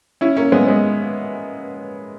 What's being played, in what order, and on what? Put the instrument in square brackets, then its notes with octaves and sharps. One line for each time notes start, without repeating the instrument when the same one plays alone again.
[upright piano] C#4 E4
A#3 C#4
G#3 B3
G#3 B3